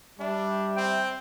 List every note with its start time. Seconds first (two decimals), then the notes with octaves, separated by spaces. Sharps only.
0.20 G3 D4 E5
0.77 C4 G5